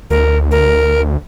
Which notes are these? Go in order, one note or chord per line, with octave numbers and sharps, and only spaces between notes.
D2 A#4
A#4